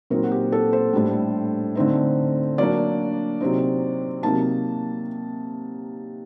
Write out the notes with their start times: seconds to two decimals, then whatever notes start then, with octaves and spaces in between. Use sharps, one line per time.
0.10 A#2 F#3 C4 D#4 A#4
0.24 F#4
0.32 G4
0.52 A4
0.73 C5
0.93 A2 G3 D4
1.75 D3 A3 C4 D#4
2.58 F#3 A#3 D4 D5
3.40 C3 F#3 C4 D#4
4.23 C3 F#3 A#3 D#4 A5